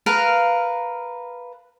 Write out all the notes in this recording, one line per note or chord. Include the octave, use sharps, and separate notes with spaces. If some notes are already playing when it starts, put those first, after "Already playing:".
A#4 B4 F5